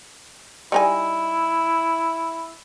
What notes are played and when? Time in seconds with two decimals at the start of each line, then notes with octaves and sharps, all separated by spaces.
0.72 G3 D#4 E4 G#5